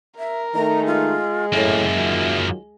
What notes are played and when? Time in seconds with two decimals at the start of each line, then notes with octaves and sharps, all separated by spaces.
0.18 A#4 E5
0.55 D#3 A3 D#4 A#5
0.87 G#3 F4
1.53 F#2 A2 A#3 E5
1.95 D#3 F#3 F4